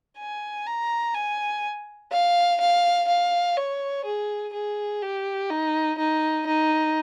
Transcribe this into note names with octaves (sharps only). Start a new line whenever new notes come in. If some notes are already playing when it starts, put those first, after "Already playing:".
G#5
A#5
G#5
F5
F5
F5
C#5
G#4
G#4
G4
D#4
D#4
D#4